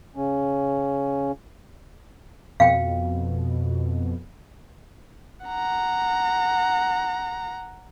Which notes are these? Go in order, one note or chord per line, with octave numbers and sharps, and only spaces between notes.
C#3 C#4
F2 B2 F5 G5
F#5 A#5